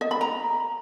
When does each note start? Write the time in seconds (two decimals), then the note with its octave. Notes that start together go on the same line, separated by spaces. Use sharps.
0.01 D#5
0.11 B5
0.21 A#5